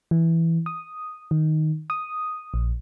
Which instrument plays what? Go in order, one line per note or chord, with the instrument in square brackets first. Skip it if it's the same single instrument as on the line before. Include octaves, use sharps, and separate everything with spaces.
[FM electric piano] E3
D#6
D#3
D#6
A#1